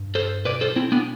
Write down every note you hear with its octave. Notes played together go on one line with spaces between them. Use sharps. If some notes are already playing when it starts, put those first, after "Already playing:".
Already playing: G2
A4 C5
B2 B4 D5
A4 C5
C4 E4
B3 D4